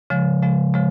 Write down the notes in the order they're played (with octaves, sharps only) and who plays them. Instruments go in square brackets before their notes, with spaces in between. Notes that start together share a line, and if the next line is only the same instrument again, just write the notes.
[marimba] C#3 F3 G#3
C#3 F3 G#3
C#3 F3 G#3